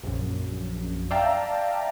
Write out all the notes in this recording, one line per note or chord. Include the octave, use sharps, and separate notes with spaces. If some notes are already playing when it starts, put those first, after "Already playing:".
A#1 F#2
D5 E5 F5 G5 A5 A#5